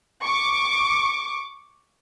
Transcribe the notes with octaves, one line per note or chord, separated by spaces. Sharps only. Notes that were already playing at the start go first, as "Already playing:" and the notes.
C#6 D6